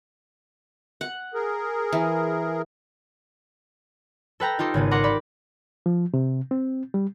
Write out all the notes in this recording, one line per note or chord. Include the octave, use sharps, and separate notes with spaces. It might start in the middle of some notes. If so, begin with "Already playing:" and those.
F#5
G#4 A#4
E3
A4 B4 G5 A#5
D#4 F4 G4 A4
G#1 C#3 B3 D#7
A#4 F#5 A#5 C6 D6
G4 D5 B5
F3
C3
C4
G3